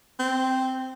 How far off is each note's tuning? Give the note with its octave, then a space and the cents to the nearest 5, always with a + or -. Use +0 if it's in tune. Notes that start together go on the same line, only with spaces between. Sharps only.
C4 -5